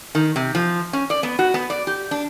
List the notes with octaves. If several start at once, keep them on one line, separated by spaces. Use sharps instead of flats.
D#3
C3
F3
C#4
D5
B3
F#4
B3
D5
G4
D4